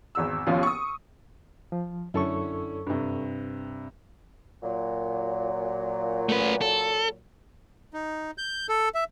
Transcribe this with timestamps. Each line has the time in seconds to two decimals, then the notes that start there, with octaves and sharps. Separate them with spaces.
0.15 G#1 E2 E6
0.47 D#2 B2 F3 C#4
0.63 C#6 D#6
1.72 F3
2.14 F#2 D3 C#4 E4 A4 C#6
2.87 G2 C3
4.63 A#2 F#3
6.29 A3 B4
6.61 A4
7.94 D#4
8.38 G6
8.69 A4
8.95 E5